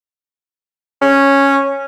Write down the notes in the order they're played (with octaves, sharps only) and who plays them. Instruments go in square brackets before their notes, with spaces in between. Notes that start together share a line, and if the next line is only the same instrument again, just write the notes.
[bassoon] C#4